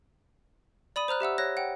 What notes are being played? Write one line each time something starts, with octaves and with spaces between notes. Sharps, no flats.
D5 B5 D#6 D#7
C5 A#5 F6 F#6
G4 E5 F#5 E6
C#5 F#6 A#6
F#5 G5